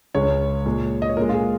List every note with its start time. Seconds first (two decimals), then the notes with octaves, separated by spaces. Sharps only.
0.14 C#2 C#3 G#3 C#5
0.66 A#2 G#3
1.02 D#5
1.09 C#5
1.17 A#2 G#3 A#4
1.29 F4
1.34 G#4